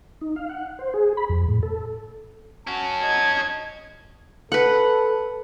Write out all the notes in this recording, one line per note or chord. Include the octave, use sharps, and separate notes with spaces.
D#4
F5
F#5
C5
G#4
B5
F2
A2
A4
C#4 F#4 A5
D#5 G#6
A4 B4 F#5